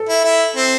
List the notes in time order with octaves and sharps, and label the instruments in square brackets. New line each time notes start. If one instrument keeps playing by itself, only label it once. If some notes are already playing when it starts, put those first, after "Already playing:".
Already playing: [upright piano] A4
[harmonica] E4
E4
C4